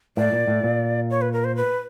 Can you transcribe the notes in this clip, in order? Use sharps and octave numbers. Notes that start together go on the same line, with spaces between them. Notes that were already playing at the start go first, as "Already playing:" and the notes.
A2 D5
A#2
A2
A#2
C#5
B4
A#4
C5
B4